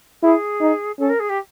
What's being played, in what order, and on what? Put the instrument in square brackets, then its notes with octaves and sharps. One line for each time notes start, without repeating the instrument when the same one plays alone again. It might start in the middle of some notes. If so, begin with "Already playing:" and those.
[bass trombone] E4 [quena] G#4
[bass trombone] D#4
[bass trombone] C#4 [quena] A4
[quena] A#4
G#4
G4